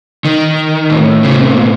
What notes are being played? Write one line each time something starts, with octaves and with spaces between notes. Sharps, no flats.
D#3
A#2
A2
C#3
C3
B2